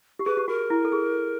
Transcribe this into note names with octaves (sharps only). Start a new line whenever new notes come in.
G4
G#4 B4
G4
F#4 A#4
E4
A4
G#4